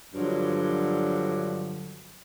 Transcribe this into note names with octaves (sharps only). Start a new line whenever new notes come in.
G2 D3 F3 F#3